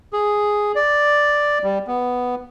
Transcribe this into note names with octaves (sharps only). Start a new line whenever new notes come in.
G#4
D5
G3
B3